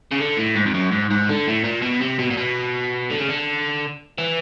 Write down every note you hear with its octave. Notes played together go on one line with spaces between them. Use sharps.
C#3
D3
A2
G#2
F2
F#2
G#2
G#2
D3
A2
A#2
B2
C3
B2
A#2
B2
D3
C#3
D3
E3